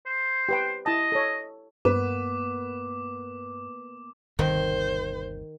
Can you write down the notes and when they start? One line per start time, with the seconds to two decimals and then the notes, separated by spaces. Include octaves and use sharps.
0.06 C5
0.49 G4 B4 G5
0.86 E4 D#5 A5
1.12 A4 C#5
1.85 G2 A#3 B3 B4 D6
4.39 G1 D#2 C3 D#3 C5